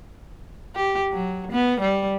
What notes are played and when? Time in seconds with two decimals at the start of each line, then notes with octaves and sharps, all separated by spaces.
0.76 G4
1.13 F#3
1.52 B3
1.81 G3